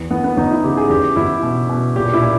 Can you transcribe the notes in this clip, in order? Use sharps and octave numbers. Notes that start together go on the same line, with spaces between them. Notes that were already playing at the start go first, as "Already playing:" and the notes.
Already playing: E2
E3 B3
B3
E2 D#4
E4
C#3 G4
G#4
E2 G4
E2 E4
B2
B2
A#2 G4
E4
A#2